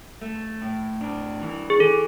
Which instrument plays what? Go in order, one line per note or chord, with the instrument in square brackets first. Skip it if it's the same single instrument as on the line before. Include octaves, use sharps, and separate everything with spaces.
[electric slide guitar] A3
A2
D4
E3
[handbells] G#4
[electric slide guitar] E3 [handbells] A4